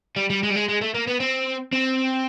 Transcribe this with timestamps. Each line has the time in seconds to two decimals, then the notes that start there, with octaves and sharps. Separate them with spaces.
0.16 G3
0.30 G3
0.43 G#3
0.50 G3
0.56 G#3
0.69 G#3
0.82 A3
0.95 A#3
1.07 B3
1.20 C4
1.73 C4